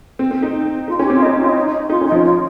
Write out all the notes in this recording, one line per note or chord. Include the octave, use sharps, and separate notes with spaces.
C4
C4
D#4
D#4 F4
C#4
G4
C4
F4
C#4 D#4
F4
D#4
D#4
D#4 F4
C#4
D#4
F3
F4